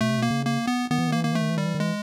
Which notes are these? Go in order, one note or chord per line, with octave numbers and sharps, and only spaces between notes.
B2 A3
C3
B2 A#3
C#3
A#3
B3
D#3 B3
E3
D#3
E3 A#3
D#3 A#3
E3 A3
D#3
E3
D#3 G3
E3
D#3
E3 G#3